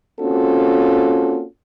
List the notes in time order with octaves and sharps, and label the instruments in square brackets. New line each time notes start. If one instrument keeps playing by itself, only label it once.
[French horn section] A#3 C4 C#4 F4 F#4 A4